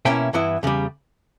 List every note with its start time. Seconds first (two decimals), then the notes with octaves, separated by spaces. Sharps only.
0.05 B2 A#3 C#4 E4 E5 G5
0.33 G2 E3 B3 E4
0.63 E2 C#3 G3